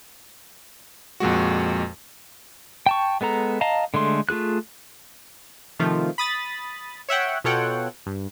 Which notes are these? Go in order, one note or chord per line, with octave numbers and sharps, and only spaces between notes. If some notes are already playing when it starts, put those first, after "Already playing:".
F2 A#2 G#3 F#4
G5 A5 C#6
G#3 B3 A4 A#5
D#5 F5 A5 A#5
D3 G#3 A3 C6
A3 F4 G#4 F#6
C3 D#3 F3 A3 F4
B5 D#6 A6
C#5 E5 F#5 G5
B2 F4 A4 C#5 F#5 G5
G2